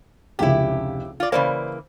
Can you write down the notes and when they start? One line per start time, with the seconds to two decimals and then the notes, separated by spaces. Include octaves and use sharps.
0.39 F1 C#2 C#3 E4 G4
1.20 F4 D5
1.32 C#3 E3 A#3 C5 D5